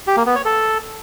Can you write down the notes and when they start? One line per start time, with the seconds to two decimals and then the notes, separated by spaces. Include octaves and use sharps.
0.07 G4
0.17 A#3
0.26 B3
0.36 C#5
0.45 A4